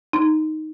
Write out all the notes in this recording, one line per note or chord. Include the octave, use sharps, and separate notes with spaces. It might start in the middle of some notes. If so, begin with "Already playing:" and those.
D#4